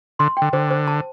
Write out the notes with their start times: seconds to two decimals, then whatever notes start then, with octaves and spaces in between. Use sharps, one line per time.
0.19 D3 C6
0.37 G5
0.42 D3
0.53 D3 C5
0.71 C5
0.88 A5